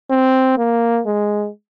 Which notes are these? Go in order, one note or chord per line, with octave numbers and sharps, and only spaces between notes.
C4
A#3
G#3